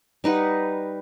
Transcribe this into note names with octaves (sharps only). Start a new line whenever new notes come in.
G3 D#4 B4 F#5